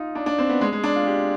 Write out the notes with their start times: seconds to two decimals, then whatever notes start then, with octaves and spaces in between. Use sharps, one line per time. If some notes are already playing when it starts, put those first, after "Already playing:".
Already playing: D#4 F4
0.15 D4
0.26 D4
0.39 C4
0.49 B3
0.61 G#3
0.73 G#3
0.84 D4
0.96 F4
1.07 G4